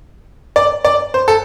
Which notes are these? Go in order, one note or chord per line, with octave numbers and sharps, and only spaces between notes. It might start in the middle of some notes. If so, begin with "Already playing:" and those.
D5
D5
C5
A4